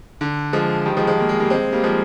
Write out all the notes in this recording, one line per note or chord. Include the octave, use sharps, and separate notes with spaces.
D3
F3 G#3
D#3 G3
F3 G#3
F3 G#3
A#3
G#3
G3 A#3
G#3 C4
G3 A#3
F3 G#3